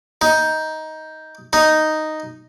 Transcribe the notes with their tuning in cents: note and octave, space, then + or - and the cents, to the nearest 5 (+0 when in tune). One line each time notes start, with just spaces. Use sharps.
D#4 +15
D#4 +0